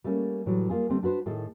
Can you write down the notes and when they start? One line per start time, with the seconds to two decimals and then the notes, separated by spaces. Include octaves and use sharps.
0.04 G3 A3 A#3 C#4
0.46 A2 E3 F#3 G3
0.69 G3 A#3 F4 G#4
0.90 D3 G3 A3 C4
1.03 D4 F#4 B4 C5
1.26 A2 D#3 G#4 A4